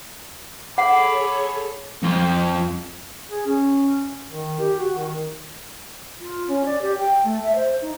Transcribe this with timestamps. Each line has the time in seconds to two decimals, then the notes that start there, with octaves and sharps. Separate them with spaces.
0.78 G#4 A4 C#5 F#5 B5 D6
2.03 F2 F4
3.30 G#4
3.46 C#4
4.29 D#3
4.59 G4
4.79 F#4
4.96 D#3
6.20 F4
6.48 C#4
6.66 D5
6.82 G4
6.98 G5
7.24 A3
7.43 E5
7.56 C5
7.82 D#4